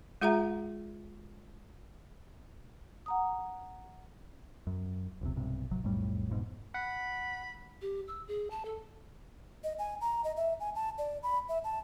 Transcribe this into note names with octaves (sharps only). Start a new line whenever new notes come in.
G#3 F4 G#4 E5 F#5 A#5
F#5 A#5 D#6
F#2
D#1 A#1 C3
B1 G2 C3
G#1 C3 F#3
B1 F2 A2 G3
G1 F2 G#2 B2
F#5 B5
G4
E6
G#4
A5
A4
D#5
G#5
A#5
D#5
E5
G#5
A5
D5
B5
E5
A5